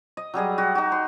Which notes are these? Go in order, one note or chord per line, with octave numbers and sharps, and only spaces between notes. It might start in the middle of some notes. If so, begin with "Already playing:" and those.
D#5
F#3 G3 G#4 D#5
F#4 G4
D#4 F#4
C6